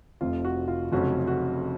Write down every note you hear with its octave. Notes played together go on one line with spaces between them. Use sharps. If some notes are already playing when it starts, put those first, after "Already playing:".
F1 F2 C3 F4
F#4
F4
F1 F2 C#3 F#3 C#4 F#4
F#4